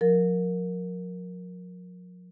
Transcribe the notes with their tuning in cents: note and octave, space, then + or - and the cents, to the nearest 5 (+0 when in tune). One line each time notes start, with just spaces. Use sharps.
F3 +45 A#4 +0